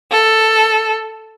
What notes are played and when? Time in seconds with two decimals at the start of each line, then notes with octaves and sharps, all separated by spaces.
0.11 A4